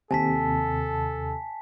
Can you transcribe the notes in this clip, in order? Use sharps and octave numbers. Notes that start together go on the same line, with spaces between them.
D#2 C3 A4 G#5 A5 B6